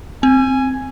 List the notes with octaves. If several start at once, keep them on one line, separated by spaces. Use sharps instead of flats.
C4 G#5